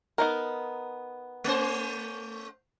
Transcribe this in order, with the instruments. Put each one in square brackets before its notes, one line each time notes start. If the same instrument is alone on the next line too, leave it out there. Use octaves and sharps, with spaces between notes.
[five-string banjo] B3 D#4 A#4
[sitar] A3 C#4 C5